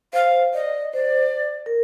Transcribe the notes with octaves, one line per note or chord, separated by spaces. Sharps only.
C5 F5
D5 D#5
C5 D5
A#4